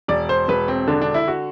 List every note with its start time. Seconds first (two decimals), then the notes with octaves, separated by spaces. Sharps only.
0.08 E1 D5
0.29 C5
0.48 E1 B4
0.68 C4
0.87 D3 D4
1.01 D4
1.14 E4
1.28 F#4